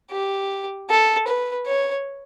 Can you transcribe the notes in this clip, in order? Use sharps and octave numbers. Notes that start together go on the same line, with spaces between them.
G4
A4
B4
C#5